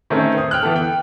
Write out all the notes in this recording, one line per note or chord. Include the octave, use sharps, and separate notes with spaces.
D#3 A3 C4 C#4
C5 D#6
G5 F6 F#6
E3 B3 A4
G5